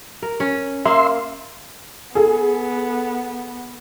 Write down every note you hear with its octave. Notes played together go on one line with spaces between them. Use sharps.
A#4
C#4
A#3 E5 C6
B3 G#4 A4